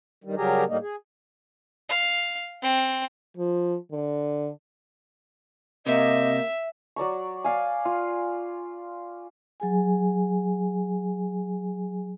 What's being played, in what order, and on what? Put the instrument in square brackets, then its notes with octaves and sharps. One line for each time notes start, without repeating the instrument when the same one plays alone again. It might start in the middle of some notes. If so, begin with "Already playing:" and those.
[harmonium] G2 D#3 G3
C#3 F#3 G3 G4 G#4 A#4
A2 G3 A#3 D#4
G#4
[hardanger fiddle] F5
C4
[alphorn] F3
D3
[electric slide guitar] C3 [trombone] A#3 [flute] D#5 [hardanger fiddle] E5
[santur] F#3 D5 A#5 C#6
D5 F5 G#5
F4
[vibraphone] F#3 G#4 G#5